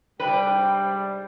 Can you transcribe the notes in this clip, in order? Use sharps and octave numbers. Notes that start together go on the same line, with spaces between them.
G#2 C3 G3 D4 B4 G5